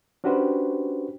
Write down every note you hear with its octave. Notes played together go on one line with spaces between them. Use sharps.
C#4 D4 F#4 G4 B4 C5